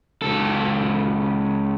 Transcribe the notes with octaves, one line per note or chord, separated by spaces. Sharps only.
C#2 A4